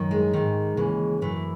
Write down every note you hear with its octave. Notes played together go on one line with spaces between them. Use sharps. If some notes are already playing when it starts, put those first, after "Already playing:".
Already playing: F#2 D#3
G#3
G#2 D#3
D#2 C#3 E3
F#2 E3 A3